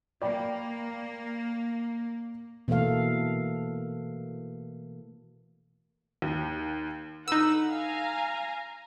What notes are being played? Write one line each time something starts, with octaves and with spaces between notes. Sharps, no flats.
A#3 D5 G5 B5
B2 E3 A3 A#3 A4 F5
D#2
D3 D#4 B4 F#5 E6
F5 G#5 A#5